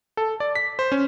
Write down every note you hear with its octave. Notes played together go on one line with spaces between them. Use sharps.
A4
D5
B6
C5
C#4